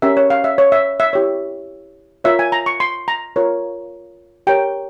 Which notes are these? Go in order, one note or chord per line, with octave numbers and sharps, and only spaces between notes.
C#4 G4 A#4 E5
C#5
F5
E5
C#5
E5
E5
E4 G4 C#5
F4 A#4 C#5 E5
G#5
A#5
C#6
C6
A#5
F4 A#4 C#5
G4 A#4 C#5 G5